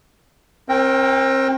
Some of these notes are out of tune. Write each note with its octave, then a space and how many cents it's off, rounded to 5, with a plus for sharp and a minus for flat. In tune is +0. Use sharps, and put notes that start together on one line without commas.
C4 +35 A#4 +10 G5 -10